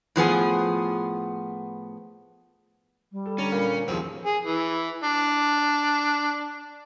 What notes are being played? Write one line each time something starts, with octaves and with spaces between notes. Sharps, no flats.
A2 F3 B3 G#4
G3
A4
D3 C#4 A5 A#5
A#2
E2 D3 D#3 F3 C4 G4 G#4
G#4
E3
D4